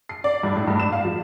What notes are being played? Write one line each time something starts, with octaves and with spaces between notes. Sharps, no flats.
C7
D5
G2
A2
G2
E7
F5
F3